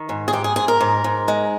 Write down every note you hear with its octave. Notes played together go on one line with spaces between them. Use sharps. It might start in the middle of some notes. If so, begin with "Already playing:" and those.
Already playing: D#3
G#2
G#4
G#2 G4
G#4
G#2 G#4
A#4
G#2
G#2
G#3